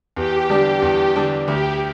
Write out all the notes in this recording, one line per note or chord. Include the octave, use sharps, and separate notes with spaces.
E2 G4
D3 G3 D4
E2
D3 G3 D4
D2 G4